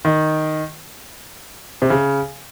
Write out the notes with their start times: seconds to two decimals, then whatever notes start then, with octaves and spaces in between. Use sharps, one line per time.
0.05 D#3
1.82 C3
1.90 C#3